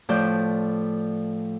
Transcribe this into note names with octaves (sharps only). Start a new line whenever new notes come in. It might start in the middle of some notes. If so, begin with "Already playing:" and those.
A2 F3 D5 G6